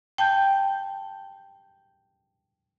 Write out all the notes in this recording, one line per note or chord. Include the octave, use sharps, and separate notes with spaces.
G5 A5 G6